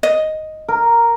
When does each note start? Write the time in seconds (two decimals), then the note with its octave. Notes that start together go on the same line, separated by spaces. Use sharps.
0.03 D#5
0.68 A#4